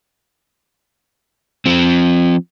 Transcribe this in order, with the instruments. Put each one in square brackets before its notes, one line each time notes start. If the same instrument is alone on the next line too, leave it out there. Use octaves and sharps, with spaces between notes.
[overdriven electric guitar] F3 C4